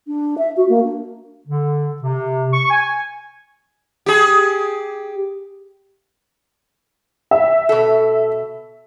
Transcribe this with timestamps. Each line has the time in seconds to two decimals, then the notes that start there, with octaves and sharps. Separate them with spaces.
0.07 D4
0.38 E5
0.57 F#4
0.68 A#3
0.83 D4
1.48 D3
2.02 C3
2.53 C#6
2.70 G#5
4.06 G4 G#4
7.31 E5
7.69 B2 A4